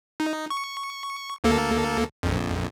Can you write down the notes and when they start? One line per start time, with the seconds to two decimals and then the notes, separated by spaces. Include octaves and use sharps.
0.20 D#4
0.50 C#6
1.44 D2 A#3 A4
2.23 A#1 F2